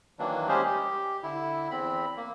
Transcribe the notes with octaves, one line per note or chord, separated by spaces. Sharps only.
D#3 E3 F#3 A#3 D4
G3 G#3 C#4 G4 G#4 C5
G4
D3 E4
E2 C4 B5
A#3